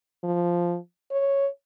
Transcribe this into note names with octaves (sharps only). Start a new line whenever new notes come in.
F3
C#5